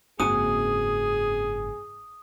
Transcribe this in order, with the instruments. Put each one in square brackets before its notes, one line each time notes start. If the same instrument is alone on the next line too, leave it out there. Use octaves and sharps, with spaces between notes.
[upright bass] F#1 G#2 [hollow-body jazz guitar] C4 F#4 G#5 [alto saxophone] G#4 [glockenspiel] D#6